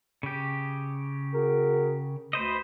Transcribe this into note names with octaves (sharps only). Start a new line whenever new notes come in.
C#3 G4
F#4 G#4 A#4
D2 B4 C5 D#5